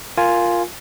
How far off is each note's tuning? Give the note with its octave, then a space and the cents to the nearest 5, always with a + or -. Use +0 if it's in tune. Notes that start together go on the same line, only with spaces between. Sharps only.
F4 +0 A#4 +0 G#5 +0